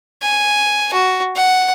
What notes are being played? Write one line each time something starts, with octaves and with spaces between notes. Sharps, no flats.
G#5
F#4
F#5